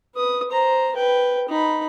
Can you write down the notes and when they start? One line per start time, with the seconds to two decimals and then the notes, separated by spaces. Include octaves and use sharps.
0.15 B4 D#6
0.50 C5 A#5
0.95 B4 G5
1.48 D#4 B5